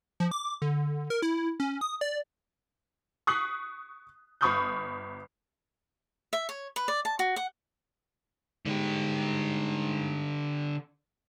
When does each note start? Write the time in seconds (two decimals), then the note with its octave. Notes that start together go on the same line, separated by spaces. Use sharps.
0.20 F3
0.31 D6
0.62 D3
1.10 A#4
1.22 E4
1.60 C#4
1.81 D#6
2.01 D5
3.27 C#6 D#6 F#6 B6 C7 F#7
4.41 G1 B5 C#6 D#6 F6 G6
6.33 E5
6.49 C#5
6.76 B4
6.88 D5
7.05 A5
7.19 F#4
7.36 F#5
8.65 G#2 D3 G4